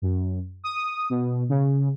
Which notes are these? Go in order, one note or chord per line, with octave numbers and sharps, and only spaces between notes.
F#2
D#6
B2
C#3